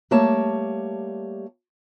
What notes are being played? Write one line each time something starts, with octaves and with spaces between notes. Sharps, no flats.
G3 A3 A#3 C#5 A5